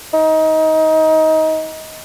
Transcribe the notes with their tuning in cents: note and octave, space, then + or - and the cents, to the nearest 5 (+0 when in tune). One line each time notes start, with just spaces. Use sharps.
D#4 +20